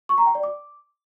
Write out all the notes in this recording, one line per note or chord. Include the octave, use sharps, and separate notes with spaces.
C#6
A#5
G5
D5
D6